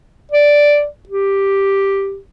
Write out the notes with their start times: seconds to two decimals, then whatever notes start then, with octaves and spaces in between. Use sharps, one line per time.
0.32 D5
1.09 G4